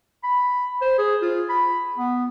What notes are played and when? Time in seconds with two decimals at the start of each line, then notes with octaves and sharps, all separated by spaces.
0.24 B5
0.82 C5
0.98 G#4
1.22 F4
1.49 B5
1.98 B3